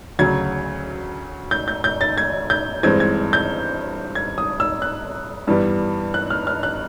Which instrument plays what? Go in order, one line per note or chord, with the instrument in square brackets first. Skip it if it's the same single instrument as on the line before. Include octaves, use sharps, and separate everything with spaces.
[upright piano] D2 C#3 F#3 G#6
G6
G6
G6
A6
G#6
G6
G2 E3 G#3 C4 G#6
G#6
G6
G#6
D#6
E6
F#6
G2 E3 G3 B3
F#6
F6
F6
F#6